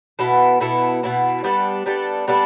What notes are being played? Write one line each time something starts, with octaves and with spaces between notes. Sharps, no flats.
B2 B3 E4 A4
B2 B3 E4 A4
B2 B3 E4 A4
G3 B3 D4 A4
G3 B3 D4 A4
G3 B3 D4 A4